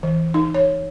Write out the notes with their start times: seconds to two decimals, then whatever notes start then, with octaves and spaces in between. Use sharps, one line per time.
0.03 E3
0.34 D#4
0.54 C#5